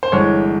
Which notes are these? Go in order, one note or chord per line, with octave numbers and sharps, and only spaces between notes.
C5
G1 G2 E3 G#3 C#5